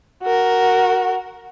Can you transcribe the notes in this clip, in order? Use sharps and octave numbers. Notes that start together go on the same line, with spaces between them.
F#4 A#4